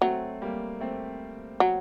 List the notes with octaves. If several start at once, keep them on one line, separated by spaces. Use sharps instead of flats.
F#3 A3 C4
G3 A#3
A3 C4
F#3